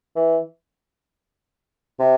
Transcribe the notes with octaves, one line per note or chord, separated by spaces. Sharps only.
E3
C3